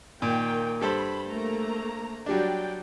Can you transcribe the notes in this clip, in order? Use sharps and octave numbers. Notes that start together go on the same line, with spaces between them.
A#2 D#3 A#3 G5
G2 A4 C5 B5
A3 A#3 A#5
F#3 G3 D4 D5 G5